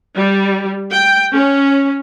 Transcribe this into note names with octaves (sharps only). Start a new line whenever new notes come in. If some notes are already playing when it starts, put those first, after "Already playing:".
G3
G5
C#4